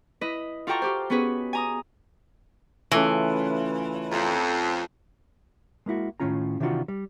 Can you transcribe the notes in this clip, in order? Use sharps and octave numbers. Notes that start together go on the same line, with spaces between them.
E4 B4 D#5
F4 F#4 A4 G5 A#5 C#6
F4 G4 C5
B3 C#4 F#4 G#4 B4
G#5 A#5 D#6
C#3 E3 A3 F4
F2 A#5 C6
G#3 A#3 E4 F#4
A2 D#3 E3 C#4 F4 A#5
C3 D#3 E3 D4 F4 F#4
G3